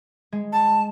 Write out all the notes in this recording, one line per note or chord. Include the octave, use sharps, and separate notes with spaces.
G#3
A5